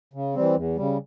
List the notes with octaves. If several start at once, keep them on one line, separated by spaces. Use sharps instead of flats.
C#3
E3 G3 C4
E2
C#3 G3